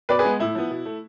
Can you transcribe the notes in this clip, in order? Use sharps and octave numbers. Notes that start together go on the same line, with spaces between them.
B2 B4 D5
G#4 B4
G#3 B3
A2 E4
F3 B3
B2
A3